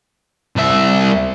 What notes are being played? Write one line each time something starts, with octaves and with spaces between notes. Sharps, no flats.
C2 E5